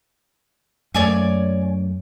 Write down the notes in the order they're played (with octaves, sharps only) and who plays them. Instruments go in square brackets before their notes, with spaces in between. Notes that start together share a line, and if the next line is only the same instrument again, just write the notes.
[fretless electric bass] F#2 A3 A#3 [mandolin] C#5 D5 G#5